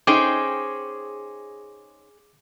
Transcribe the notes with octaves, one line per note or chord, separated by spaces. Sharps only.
C#4 D#4 G#4 C5 G5 D6